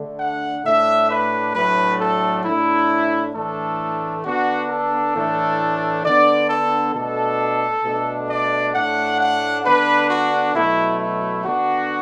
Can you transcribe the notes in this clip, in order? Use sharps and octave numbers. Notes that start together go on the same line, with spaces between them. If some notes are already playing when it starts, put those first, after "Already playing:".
Already playing: D3 A3 D4
F#5
A2 A3 D4 E5
B4
A2 F#3 A3 D4 B4
A4
A2 A3 D4 E4
A2 E3 A3 D4 A4
D3 B3 D4 F#4
A4
A2 E3 A3 D4
D3 B3 D4 D5
A4
B2 A3 D4 A4
B2 A3 D4
D5
A2 A3 D4 F#5
F#5
D3 B3 D4 B4
F#4
B2 F#3 A3 E4
E4
D3 B3 D4 F#4